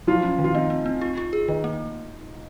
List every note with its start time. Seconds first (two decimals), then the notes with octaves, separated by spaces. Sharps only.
0.07 F3 F#3 F4
0.23 C#4
0.39 D#3
0.44 F4
0.54 C4 D#4
0.70 C4
0.86 C4
1.01 F4
1.17 F4
1.33 G#4
1.48 D#3 D#4
1.64 A#3